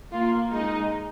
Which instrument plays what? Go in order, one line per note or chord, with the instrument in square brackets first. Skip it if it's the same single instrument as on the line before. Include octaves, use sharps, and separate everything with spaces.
[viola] A#3 [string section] F4
[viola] G#3 [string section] D#4